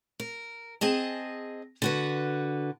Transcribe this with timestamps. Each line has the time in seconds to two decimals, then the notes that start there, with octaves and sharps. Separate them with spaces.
0.20 A#4
0.81 C4 G#4 D#5 A5
1.82 D3 F#4 B4